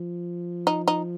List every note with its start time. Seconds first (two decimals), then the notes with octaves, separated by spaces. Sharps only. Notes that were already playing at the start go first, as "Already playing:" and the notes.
Already playing: F3
0.67 D#4
0.88 D#4